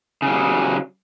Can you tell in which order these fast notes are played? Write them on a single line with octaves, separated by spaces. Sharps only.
C#3 F#3 G3